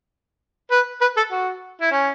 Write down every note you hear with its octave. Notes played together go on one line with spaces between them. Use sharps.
B4
B4
A4
F#4
E4
C#4